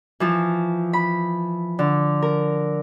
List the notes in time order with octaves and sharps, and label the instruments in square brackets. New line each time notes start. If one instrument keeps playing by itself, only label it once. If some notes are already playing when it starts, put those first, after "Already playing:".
[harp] E3 F3
B5
D3
A#4